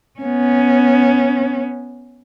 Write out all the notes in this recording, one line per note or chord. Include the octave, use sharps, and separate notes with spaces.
B3 C#4